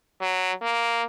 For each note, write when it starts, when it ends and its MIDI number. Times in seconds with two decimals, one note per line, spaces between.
0.21 0.52 54
0.62 1.03 58